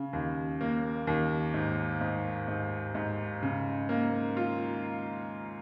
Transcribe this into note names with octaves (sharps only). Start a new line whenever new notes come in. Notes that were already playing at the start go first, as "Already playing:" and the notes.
Already playing: C#3
D#2
A#3
D#2
G#2
G#2
G#2
G#2
C#3
A#3
F4